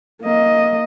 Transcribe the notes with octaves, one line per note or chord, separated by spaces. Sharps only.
A#3 D#5